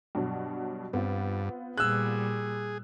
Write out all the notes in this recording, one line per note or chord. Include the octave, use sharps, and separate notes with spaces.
G2 B2 F#3
G2 B3 C4 F4
A#2 G3 G#4 E6 F#6